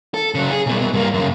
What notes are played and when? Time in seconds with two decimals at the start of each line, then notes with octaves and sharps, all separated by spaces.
0.14 A4
0.35 C#3 F#3
0.51 G#4
0.66 C2 B2
0.93 G2 A#3
1.14 F#2 C#3